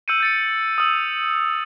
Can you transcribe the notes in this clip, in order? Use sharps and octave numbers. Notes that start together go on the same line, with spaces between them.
E6 G6 C#7 D#7
G6 A6 C#7
D#6 E6